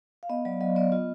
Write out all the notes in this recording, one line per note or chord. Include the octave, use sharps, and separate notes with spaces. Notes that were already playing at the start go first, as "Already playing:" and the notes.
F5
B3 D#5
F#3 D5
F#3 D#5
B3 D5
F4 D#5